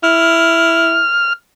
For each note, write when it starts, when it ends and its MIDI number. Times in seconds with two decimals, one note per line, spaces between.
0.03 1.01 64
0.03 1.33 89